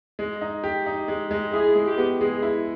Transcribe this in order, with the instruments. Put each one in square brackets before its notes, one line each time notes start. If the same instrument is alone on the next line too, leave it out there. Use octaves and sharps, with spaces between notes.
[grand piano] G#3
D#4
G4
D#4
G#3
G#3
[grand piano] E4 [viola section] G#4
[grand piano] G#3
[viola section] G4
[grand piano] B3
[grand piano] G#3 [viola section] G#4
[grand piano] E4